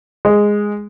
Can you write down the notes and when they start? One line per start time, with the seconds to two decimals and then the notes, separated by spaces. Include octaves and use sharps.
0.25 G#3